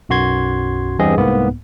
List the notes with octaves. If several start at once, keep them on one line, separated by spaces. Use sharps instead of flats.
B1 F#2 F#4 C6 G#6
E2 G2 B3 C4 G#4 D#5
C2 G#2 A#3 B3